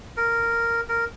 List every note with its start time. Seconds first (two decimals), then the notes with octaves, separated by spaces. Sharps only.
0.17 A#4
0.89 A#4